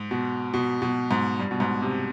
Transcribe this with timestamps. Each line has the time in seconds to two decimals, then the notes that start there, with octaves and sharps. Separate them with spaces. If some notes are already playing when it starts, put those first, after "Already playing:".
Already playing: G#2
0.11 B2
0.54 B2
0.82 B2
1.11 G#2
1.39 G2
1.51 B2
1.60 G#2
1.82 C3